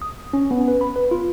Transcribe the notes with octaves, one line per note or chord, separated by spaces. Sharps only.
D#6
C#4
B3
B4
B5
B4
F4